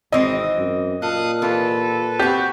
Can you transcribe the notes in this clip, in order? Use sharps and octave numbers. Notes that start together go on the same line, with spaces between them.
G#1 E3 C4 D#5
F#2
A#2 A4 F5 D#6 F#6
E3 F4 G4 A4 B4
C4 F#4 G4